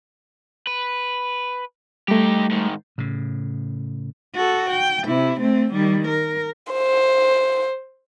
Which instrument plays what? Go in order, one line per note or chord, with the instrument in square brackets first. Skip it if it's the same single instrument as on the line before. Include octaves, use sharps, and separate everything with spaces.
[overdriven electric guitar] B4
[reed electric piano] G3 A3 [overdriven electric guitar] D#4 G4
[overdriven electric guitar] G#2 D#3
[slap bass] A2 C#3
[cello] F#4 A4
G5
C3 E4
A3 C4
D#3 G3
A#4
[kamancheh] C5